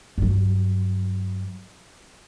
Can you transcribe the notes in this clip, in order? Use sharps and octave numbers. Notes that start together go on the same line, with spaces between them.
G2 F#3